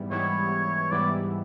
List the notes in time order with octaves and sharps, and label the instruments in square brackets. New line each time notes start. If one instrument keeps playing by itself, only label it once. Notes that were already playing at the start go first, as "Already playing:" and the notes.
Already playing: [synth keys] G#2 E3 G3 B3 E4
[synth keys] G#2 E3 G3 B3 E4 [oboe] C#5
[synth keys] G#2 E3 G3 B3 E4 [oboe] D5